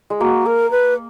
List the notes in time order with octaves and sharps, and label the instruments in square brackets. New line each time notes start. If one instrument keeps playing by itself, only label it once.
[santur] G#3
[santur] A#3 [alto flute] F#4
[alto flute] A#4
B4